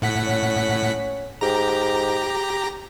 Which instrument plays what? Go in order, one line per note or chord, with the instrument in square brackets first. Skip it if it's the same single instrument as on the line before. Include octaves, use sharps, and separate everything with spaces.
[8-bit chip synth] A2 F#5 B6
[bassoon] C#4
[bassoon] G#2 [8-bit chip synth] G4 A#5